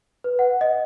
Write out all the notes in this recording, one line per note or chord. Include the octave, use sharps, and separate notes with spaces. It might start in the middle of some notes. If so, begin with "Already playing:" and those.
B4
F#5
D#5